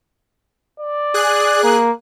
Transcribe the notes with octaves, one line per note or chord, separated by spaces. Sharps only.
D5
G#4 F#6
A#3